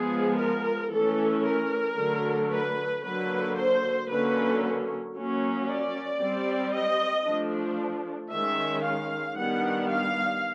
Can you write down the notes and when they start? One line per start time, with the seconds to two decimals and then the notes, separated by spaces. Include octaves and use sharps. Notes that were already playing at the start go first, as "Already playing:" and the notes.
Already playing: F3 G#3 B3 G#4
0.39 A#4
0.92 E3 A3 C#4 A4
1.46 A#4
1.97 D3 F#3 A3
2.51 B4
3.04 D3 F#3 A#3 B4
3.56 C5
4.09 D3 F#3 A#3 C#4 B4
5.15 F#3 A#3 C#4
5.67 D5
6.20 G3 C4
6.73 D#5
7.26 F3 A3 D4
8.31 D#3 G#3 C#4 E5
8.85 F5
9.37 D#3 G3 B3 D4 F#5
9.90 F5